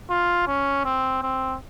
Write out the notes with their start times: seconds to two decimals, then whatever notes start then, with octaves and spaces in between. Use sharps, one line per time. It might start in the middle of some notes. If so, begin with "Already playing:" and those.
0.10 F4
0.47 C#4
0.85 C4
1.23 C4